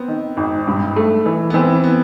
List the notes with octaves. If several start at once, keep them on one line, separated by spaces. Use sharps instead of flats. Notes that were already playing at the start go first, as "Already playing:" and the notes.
Already playing: B3 C4
D#3
G#1
G2
A3
E3
B3
E3 C4
B3